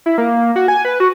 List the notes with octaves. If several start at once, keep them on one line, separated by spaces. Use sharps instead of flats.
E4
A#3
F#4
G#5
B4
F#4